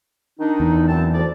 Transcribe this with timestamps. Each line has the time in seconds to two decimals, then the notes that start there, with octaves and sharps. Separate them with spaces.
0.40 D#3 D4 D#4
0.60 E2
0.88 F#2 C4 A5
1.13 D2 F3 D5